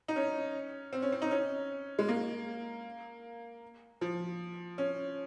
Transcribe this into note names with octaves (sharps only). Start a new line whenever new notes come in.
D#4
C#4
C4
C#4
C4
D#4
C#4
G#3
A#3
F3
C#4